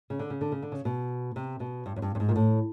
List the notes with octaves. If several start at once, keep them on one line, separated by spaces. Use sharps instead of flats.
C#3
D3
C#3
D3
C#3
D3
C#3
B2
C3
B2
G2
F#2
G2
G2
G#2
A#2
A2